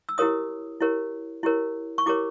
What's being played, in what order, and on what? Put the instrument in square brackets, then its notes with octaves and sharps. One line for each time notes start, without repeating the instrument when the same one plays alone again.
[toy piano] E6
E4 G4 A#4 C#5 D#6
E4 G4 A#4 C#5
E4 G4 A#4 C#5
C#6
E4 G4 A#4 C#5 D6